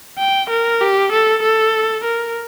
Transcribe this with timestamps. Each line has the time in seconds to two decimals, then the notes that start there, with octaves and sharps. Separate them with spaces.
0.18 G5
0.50 A#4
0.81 G4
1.12 A4
1.43 A4
2.04 A#4